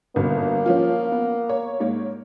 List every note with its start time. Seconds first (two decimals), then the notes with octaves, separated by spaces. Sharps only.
0.16 G1 B2 A#3
0.66 F3 C#4 F4
1.12 B3
1.49 C#5
1.80 G#2 A#3 C#5